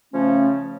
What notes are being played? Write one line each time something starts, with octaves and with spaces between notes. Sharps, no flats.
C#3 F3 A3 C#4